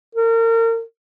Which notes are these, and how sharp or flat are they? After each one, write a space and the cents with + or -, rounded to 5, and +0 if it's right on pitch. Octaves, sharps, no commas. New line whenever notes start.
A#4 -35